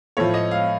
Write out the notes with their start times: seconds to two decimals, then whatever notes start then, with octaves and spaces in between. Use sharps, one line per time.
0.17 A2 F3 C#5
0.34 D#5
0.51 F5